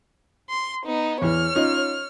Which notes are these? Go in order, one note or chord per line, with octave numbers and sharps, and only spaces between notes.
C6
B3 D#4
E2 E3 C#5 F6
C#4 D#4 F4